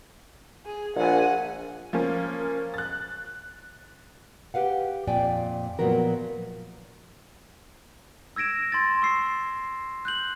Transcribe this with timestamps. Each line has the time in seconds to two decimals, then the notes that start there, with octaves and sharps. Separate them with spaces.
0.65 G#4
0.96 A#1 F#5 G#5
1.93 F3 A#3 C#4
2.74 F#6 A6
4.54 G4 B4 F5 F#5
5.07 F2 A#2 D5 G5 G#5
5.79 A#2 F3 F#3 B3 A#4
8.36 E6 G#6 A#6 D7 E7
8.72 C6 G#6 A6
9.02 C#6 E6 C7
10.05 F#6 G6 F#7